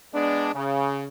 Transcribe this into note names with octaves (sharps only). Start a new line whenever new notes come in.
G#3 B3 D4
C#3